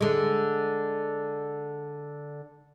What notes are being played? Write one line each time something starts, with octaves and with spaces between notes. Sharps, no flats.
D3 G#3